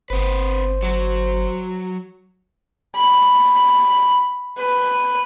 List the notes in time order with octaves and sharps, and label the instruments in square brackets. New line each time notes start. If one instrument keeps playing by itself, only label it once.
[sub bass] G1 [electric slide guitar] C4 B4 [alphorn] C5
[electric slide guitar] F#3 F#4
[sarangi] B5
B4